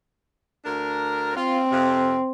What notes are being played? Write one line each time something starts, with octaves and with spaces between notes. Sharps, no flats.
D2 D4 A#4
C4 F4
F2 C3